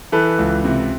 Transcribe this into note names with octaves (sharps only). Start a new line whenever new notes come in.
E3 A4 B4
C#2
C3